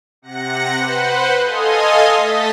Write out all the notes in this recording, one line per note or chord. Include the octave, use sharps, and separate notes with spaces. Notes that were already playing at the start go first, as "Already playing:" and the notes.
C3 F#5 A#6 C#7
B4 C5 F#5
A4 D#5 F5 G#5 C6 D#6
A3 D#5 A5 A6 B6